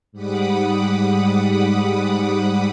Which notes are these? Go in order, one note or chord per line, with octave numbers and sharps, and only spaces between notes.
G#2 G3 F#5 B5 D6 D#6